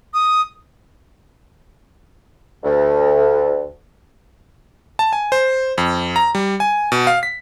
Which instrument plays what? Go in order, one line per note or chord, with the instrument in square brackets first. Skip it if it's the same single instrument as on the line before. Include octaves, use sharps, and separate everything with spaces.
[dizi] D#6
[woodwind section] D2
[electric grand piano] A5
G#5
C5
F2
A#5
G3
G#5
B2
F5
B6